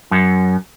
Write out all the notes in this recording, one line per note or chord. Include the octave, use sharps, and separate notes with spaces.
F#2